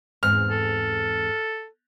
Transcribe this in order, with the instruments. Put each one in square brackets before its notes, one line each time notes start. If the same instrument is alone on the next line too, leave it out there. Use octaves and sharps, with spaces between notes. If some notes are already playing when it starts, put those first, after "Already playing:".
[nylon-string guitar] E2 G#2 C4 [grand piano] F6
[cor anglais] A4